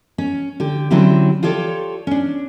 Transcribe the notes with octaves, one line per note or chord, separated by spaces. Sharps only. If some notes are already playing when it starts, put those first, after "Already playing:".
C#4
D3 G4
D3 F#3 C4 C#4 E4 G4
F4 G4 A4 C#5 D5
C#4 D4